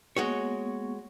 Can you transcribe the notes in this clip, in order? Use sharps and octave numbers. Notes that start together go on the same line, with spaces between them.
G#3 A#3 B3 F#4 C#5 C#6